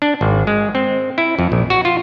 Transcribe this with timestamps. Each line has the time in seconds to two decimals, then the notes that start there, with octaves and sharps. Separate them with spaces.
0.02 D4
0.21 G#1
0.47 G#3
0.75 C4
1.18 E4
1.39 F2
1.52 A#1
1.70 F#4
1.85 F4